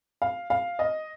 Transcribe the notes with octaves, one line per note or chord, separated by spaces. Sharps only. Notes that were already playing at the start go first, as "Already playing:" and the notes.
F5
F5
D#5